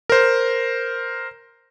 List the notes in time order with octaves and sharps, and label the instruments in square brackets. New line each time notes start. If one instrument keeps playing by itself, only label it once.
[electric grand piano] A#4 C5